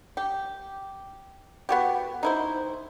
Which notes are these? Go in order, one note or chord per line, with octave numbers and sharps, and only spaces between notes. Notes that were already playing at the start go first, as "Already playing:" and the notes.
G4
B3 F#4 G4
D#4 E4 C5